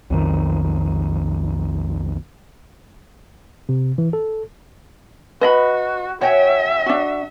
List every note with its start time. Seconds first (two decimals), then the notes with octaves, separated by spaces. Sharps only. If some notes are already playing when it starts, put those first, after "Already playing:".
0.10 B1 F2 D#3
3.69 C3
3.98 E3
4.13 A4
5.41 F#4 B4 D#5 B5
6.21 F#4 C#5 E5 G5 G#5
6.86 D4 F#4